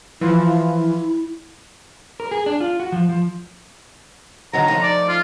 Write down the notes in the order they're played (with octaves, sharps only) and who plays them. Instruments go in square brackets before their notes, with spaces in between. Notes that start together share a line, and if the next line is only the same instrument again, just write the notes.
[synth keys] E3 F3 F4 [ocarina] E4
[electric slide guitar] A#4
G#4
D4
F4
F#4
F3
F3
[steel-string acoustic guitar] D3 D#3 F#3 [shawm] A#5
[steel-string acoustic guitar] F3 A3 D#4
[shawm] D5
F4